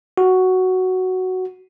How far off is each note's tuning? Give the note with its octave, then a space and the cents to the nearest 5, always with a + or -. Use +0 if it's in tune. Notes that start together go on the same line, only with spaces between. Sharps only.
F#4 +5